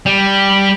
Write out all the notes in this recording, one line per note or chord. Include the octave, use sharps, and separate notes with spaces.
G3